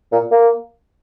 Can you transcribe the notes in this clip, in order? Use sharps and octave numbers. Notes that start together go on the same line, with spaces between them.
A#2
A#3